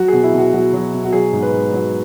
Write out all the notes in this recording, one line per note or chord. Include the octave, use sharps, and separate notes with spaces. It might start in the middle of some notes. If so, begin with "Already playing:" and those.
Already playing: F#3 F#4
B2 G#4
E4
B2 F#4
F#3 F#4
F#3
B2
F#4
F#3 G#4
G#2
B4
G#2
F#3